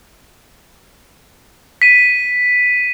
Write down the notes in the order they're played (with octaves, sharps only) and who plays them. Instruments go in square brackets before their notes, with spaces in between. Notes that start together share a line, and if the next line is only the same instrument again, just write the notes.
[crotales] B6 D#7